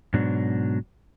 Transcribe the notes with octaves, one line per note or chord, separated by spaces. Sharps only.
G#2 B2 F#3 D4